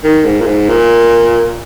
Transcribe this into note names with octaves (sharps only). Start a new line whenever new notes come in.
D#3
G#2
A#2
G#2
A#2